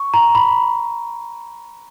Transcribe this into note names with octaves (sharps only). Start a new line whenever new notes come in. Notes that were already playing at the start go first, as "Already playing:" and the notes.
Already playing: C#6
A#5
B5